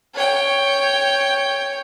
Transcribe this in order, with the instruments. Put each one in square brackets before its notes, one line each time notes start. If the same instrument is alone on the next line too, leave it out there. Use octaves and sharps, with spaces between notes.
[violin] C#5 G5